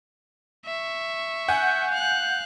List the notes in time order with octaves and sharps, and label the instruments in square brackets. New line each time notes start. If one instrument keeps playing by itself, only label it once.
[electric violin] E5 C#6
[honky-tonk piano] F#5 G#5 [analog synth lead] G6
[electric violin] F5 F#6